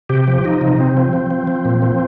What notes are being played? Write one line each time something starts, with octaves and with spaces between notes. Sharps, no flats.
C3 G4
F3
F3 D#4
C3
C3 C4
F3
F3
F3
F3
A#2
F3